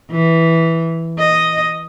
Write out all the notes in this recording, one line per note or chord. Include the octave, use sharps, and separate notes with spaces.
E3
D#5